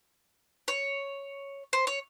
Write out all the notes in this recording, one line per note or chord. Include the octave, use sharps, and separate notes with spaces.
C#5
C5
C#5